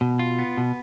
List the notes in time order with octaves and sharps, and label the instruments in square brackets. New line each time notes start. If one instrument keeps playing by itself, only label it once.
[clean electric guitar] B2
F4
B3
B2